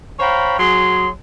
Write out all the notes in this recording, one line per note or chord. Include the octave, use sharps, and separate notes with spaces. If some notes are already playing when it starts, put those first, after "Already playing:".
C5 C#5 F5 G5 A#5 B5
F#3 G#4 C6